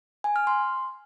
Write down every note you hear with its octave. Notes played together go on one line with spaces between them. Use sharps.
G#5
F6
C6